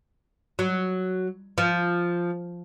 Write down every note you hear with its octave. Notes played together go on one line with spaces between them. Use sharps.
F#3
F3